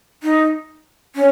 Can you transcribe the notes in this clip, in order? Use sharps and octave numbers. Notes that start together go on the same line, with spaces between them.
D#4
C#4